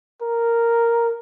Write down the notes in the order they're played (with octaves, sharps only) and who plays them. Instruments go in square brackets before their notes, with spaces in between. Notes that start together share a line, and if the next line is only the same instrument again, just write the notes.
[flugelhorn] A#4